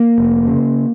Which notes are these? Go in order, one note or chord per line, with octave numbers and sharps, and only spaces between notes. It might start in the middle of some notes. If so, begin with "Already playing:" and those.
Already playing: A#3
F1
C#3